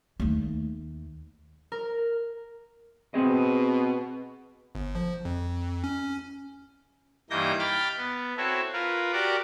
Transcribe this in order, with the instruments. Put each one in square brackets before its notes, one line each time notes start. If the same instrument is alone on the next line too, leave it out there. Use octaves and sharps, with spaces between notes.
[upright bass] D#2 A3
[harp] A#4
[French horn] B2 [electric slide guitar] C4 G#4 D#5
[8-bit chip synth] G1
F3
F2
C#4
[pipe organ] G2 E3 A#3 D#4 G6 A#6
G5 B5 F6 A6
B3
C4 E4 F#4 A4 C#5
F4 A#4 B4
F#4 G4 A#4 D5 F#5 D6